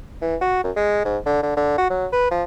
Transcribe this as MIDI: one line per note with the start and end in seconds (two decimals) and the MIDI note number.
0.22 0.36 52
0.41 0.61 66
0.64 0.71 42
0.76 1.04 56
1.05 1.18 44
1.26 1.40 50
1.43 1.54 50
1.57 1.74 50
1.78 1.89 66
1.90 2.06 54
2.12 2.30 71
2.31 2.43 53